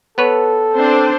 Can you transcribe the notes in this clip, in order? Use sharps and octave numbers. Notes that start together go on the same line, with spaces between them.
B3 A4 B4 C#5
C4 D4 C5